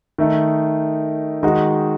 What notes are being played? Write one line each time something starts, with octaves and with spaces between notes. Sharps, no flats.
D#3 A3 D#4
D#3 G#3 D#4 F#4